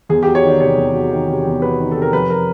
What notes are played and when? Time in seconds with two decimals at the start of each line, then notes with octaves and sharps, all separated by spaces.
0.09 E2 G#4
0.23 F#3 G4
0.35 C#5
0.43 D#3 D5
0.60 C3 C#5
0.78 E2
0.94 F#3
1.11 D#3
1.29 C3
1.46 E2
1.62 F#3 B4
1.79 D#3
1.91 C3 A4
2.02 A#4
2.13 F2 B4
2.30 A#4